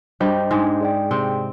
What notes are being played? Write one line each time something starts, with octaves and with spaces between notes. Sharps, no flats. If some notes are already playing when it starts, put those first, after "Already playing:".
G2 G3 D4 G4 C5 D#5 G5
G#2 G#3
G#4 D5 G5
C3 C4